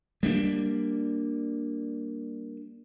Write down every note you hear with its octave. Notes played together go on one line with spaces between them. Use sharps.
G3 A#3 D4